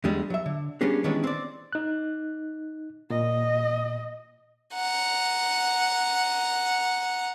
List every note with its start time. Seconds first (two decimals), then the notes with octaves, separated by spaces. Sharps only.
0.04 E2 D3 G3 G#3
0.30 F#3 E5
0.46 D3
0.81 G3 A#3 B3 C#4 D4 G#4
1.04 D#3 E3 G#3 B3 C#4 D4
1.24 C4 D5
1.72 D#4 F#6
3.10 A#2 D#5
4.74 F#5 A#5